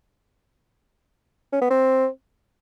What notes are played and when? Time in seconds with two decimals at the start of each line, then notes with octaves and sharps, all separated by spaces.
1.53 C#4
1.62 B3
1.70 C4